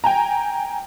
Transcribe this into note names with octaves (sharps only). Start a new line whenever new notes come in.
G5 G#5 A#5